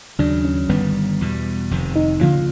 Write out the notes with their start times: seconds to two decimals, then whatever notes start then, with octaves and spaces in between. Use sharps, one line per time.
0.19 D#2 C#3 F#3 D4
0.45 C#4
0.69 G1 G2 D#3 G3 B3
1.21 E2 B2 G3
1.71 F1 F2 C3 D#3
1.96 D#4
2.21 D2 C#3 F3 A#3 F4